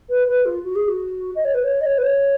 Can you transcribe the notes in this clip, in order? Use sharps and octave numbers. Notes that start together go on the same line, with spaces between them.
B4
B4
F4
F#4
G#4
F#4
D#5
C#5
B4
C#5
D#5
C#5
B4
C#5